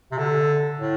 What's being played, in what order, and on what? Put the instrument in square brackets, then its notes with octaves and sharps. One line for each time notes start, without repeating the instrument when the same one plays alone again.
[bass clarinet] C3
D3
A2